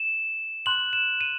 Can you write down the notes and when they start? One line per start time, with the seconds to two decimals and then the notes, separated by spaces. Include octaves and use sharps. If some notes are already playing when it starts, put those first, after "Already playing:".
Already playing: E7
0.66 C6 F#6 F#7
0.93 E7
1.21 D#7